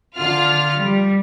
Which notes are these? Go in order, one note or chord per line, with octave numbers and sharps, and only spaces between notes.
D3 F4 F6
G3